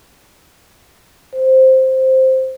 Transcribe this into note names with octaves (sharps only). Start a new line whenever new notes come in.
C5